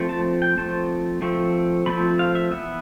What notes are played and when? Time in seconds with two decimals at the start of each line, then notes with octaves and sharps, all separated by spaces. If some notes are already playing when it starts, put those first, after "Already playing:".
Already playing: F3 A3 C4
0.09 A5
0.42 G5
0.57 F3 A3 C4 A5
1.22 F3 A3 C4
1.86 F3 A3 C4 B5
2.19 F5
2.35 E5
2.51 E3 B3 E5